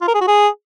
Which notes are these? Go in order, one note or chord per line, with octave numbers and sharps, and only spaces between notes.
F4
A#4
G#4
F#4
G#4